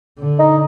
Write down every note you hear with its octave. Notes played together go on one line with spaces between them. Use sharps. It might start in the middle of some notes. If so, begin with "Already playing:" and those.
D3
D#4